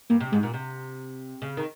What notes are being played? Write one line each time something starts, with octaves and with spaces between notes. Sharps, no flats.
G2 A#3
C3
G#2 G#3
A#2
C3
C#3
D#3